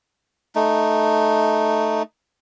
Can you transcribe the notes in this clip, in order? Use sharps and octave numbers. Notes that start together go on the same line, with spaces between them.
A3 D#4